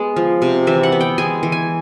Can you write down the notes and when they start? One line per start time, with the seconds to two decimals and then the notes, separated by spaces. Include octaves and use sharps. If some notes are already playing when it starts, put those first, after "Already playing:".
Already playing: G#3 B3
0.16 F3
0.42 C3
0.67 E3 E5
0.83 F#5
0.92 B3
1.01 G5
1.18 G#3 G#5
1.43 E3
1.52 G#5